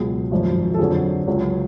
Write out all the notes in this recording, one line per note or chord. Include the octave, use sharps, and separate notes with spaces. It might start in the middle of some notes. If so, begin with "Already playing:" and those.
Already playing: C#2 B2 F#3 G#4
G#1 F#2 F3
A4
F2 D3 F#3 G#4
C#2 C#3 F#3